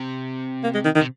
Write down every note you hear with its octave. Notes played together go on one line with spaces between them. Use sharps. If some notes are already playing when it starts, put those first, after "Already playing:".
Already playing: C3
A#3
G#3
D#3
D#3
C3